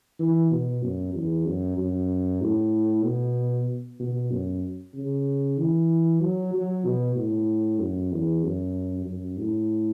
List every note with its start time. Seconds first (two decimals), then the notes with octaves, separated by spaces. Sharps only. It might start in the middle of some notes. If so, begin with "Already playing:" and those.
0.19 E3
0.51 B2
0.83 F#2
1.14 E2
1.46 F#2
1.78 F#2
2.41 A2
3.04 B2
4.00 B2
4.31 F#2
4.94 C#3
5.58 E3
6.21 F#3
6.53 F#3
6.85 B2
7.16 A2
7.80 F#2
8.12 E2
8.43 F#2
9.06 F#2
9.38 A2